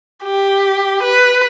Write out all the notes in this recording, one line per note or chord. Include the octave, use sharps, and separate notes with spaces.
G4
B4